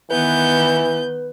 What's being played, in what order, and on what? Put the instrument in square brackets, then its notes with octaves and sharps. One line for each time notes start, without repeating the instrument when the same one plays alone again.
[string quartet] D#3 B3 G6 [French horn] E3 [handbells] B4